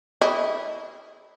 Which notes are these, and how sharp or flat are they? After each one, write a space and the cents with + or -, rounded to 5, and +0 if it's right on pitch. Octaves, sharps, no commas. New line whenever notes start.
E4 -10 D#5 -15